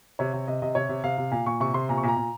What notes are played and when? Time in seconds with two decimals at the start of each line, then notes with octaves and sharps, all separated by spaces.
0.19 C3 C#5
0.33 C3
0.48 C3 D#5
0.62 C3 D#5
0.75 C3 C#5
0.89 C3
1.04 C3 F5
1.18 C3
1.32 A#2 F5
1.46 A#2 C#6
1.60 C3 C#6
1.74 C3 C6
1.89 A#2 A#5
1.97 C#6
2.03 A#2
2.08 A#5
2.17 A#2